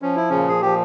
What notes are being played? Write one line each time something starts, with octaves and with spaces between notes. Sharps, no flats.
F3 C#4
E4
A#2 C#3 C#4
G#4
F3 G4